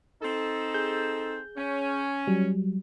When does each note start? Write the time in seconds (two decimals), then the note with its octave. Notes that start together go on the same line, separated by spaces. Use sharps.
0.22 C4 D#4 A4
0.74 G#4 G6
1.58 C#4
2.27 F#3 G3